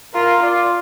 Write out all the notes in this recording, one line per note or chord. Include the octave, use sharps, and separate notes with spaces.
F4 A#4
F4 D5